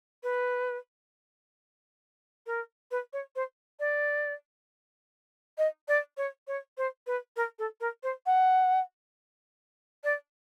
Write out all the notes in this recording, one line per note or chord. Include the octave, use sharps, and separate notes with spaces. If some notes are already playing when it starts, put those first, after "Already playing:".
B4
A#4
B4
C#5
C5
D5
D#5
D5
C#5
C#5
C5
B4
A#4
A4
A#4
C5
F#5
D5